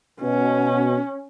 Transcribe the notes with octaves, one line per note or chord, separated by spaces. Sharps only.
B2 C#4